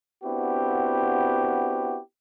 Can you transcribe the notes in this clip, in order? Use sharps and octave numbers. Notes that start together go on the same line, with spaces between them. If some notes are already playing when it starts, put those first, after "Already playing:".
B3 C4 D4 E4 F#4 G4